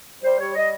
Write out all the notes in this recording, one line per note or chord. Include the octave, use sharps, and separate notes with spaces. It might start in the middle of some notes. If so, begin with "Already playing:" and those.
G3 C5
G3 C#5
G3 D#5